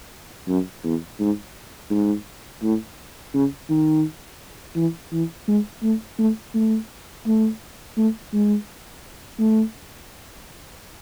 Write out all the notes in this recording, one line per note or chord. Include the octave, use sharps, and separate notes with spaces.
F#2
E2
G#2
G#2
A2
C#3
D#3
E3
E3
G#3
A3
A3
A3
A3
A3
G#3
A3